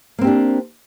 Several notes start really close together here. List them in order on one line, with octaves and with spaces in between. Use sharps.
A#3 C4 G4 D4